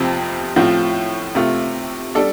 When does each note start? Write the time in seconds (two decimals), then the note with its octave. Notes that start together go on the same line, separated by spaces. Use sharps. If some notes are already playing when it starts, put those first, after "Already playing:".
Already playing: F2 C3 F3 C4
0.56 A2 F3 C4 F4
1.35 C3 A3 F4
2.15 G3 D4 A4